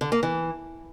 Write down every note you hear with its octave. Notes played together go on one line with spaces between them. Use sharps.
D3
A#3
E3